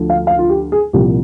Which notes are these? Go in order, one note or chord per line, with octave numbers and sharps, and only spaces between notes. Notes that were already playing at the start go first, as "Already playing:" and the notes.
Already playing: D2 D3 F3
F5
F5
F4
G4
G#4
C2 A#2 F3 G4